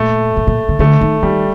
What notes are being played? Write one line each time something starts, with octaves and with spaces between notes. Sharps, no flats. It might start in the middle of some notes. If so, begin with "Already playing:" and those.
Already playing: A#2 A3
A2
A#2
D3
D3 A3
D#3
D#3 G3